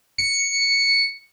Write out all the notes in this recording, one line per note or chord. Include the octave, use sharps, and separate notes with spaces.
C#7